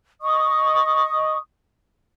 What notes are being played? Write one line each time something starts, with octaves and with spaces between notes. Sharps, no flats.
D#5 C#6 D#6